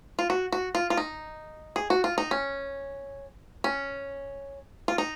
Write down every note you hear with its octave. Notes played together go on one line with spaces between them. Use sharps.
F4
F#4
F#4
F4
F4
D#4
G#4
F#4
F4
D#4
C#4
C#4
F4
D#4